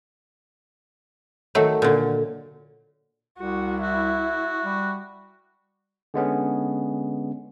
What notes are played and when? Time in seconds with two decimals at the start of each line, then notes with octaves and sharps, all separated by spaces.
1.55 D#3 F#3 A3
1.82 A#2 D3
3.38 C2 F#4
3.83 E4 F#4
4.63 G3
6.14 D3 G#3 B3 C#4